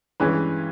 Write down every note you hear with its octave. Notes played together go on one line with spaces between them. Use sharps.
G2 E3 G#3 C#4 B4